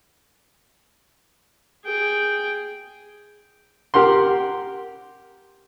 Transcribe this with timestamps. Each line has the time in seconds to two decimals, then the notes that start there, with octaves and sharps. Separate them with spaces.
1.85 G#4 G5
3.94 G4 A#4 F#5 C6